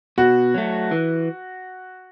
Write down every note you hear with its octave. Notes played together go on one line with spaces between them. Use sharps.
B2 F#4
F#3 A3
E3